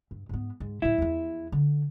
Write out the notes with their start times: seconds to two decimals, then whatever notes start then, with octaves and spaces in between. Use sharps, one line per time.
0.11 G2
0.29 G#2 B3
0.60 G#2
0.82 A2 F#3 E4
0.98 E2 F3
1.52 D3